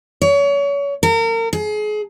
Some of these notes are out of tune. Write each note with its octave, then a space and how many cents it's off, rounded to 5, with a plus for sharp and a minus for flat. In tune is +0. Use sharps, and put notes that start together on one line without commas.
C#5 +30
A#4 -35
G#4 +30